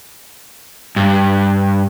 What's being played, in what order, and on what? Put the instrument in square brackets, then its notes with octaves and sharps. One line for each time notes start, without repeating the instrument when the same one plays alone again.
[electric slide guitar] G2